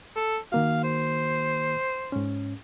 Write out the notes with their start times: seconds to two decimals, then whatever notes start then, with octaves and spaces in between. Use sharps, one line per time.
0.16 A4
0.52 D#3 A#3 F#4 F5
0.84 C5
2.12 G#2 C#4